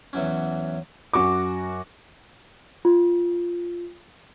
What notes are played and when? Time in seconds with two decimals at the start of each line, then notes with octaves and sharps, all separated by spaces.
0.13 E2 E3 F#3 C#4
1.13 F#2 F#4 C#6 D6
2.85 F4